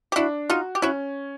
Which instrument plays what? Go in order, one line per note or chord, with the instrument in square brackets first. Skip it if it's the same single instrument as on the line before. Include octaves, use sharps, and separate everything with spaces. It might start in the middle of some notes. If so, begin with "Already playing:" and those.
[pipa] G4
[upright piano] D4 [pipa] E4 F#4
[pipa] D#4 F4 [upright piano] F#4
[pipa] G4
[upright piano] C#4 [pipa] E4 F#4